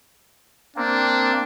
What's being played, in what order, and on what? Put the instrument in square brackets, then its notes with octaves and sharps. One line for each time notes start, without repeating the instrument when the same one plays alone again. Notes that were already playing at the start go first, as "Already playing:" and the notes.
[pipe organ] A#3 C4 [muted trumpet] D4